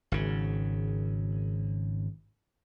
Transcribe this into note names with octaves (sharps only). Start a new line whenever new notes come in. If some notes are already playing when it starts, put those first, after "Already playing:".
G#1 C#3